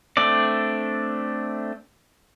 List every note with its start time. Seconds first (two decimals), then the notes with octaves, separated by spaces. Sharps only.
0.17 A3 C4 D4 D5